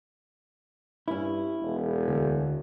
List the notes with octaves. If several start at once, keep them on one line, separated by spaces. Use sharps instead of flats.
G2 C#4 E4
E1
D2